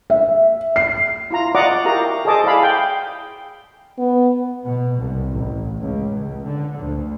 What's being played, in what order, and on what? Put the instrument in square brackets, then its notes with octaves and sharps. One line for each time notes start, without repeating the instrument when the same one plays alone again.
[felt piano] E5
C7
[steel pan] E4 F4 A#5
F#4 D5 D#5 F#5 A#5 D6
E4 F#4 G4 A#4 F5 A#5
G#4 A4 C5 D#5 A5 D6
E4 G#4 D5 F5 B5
G5
[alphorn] B3
[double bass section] B2
C2
A1
C#2
C#2
D3
D2